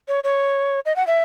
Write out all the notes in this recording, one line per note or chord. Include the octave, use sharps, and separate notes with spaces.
C#5
C#5
D#5
F#5
E5